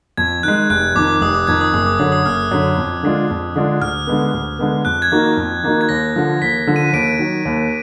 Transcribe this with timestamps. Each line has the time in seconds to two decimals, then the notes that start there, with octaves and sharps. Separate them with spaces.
0.17 F2 G#6
0.43 D#3 G#3 F#6
0.70 F1 F#6
0.95 F2 D#3 D6
1.21 F1 D#6
1.35 D6
1.47 F2 D#3 G#6
1.61 D#6
1.73 F#1 D#6
1.86 D6
1.99 F#2 D3 D#6
2.12 D#6
2.25 F#1 F6
2.51 F#2 D3
2.77 F2
3.03 D3 G#3 D4 F4
3.30 F2
3.56 D3 G#3 D4 F4
3.81 D2 F6
4.07 D3 G#3 B3
4.34 D2
4.59 D3 G#3 B3
4.85 F2 F#6
5.02 G#6
5.11 D#3 A#3 D#4 F#4
5.37 F2
5.63 D#3 A#3 D#4 F#4
5.81 G#6
5.89 D#2 A#6
6.16 D3 F3
6.41 D#2 B6
6.67 D3 F3
6.76 D#7
6.93 D#2 D7
7.19 D#3 F#3
7.45 D#2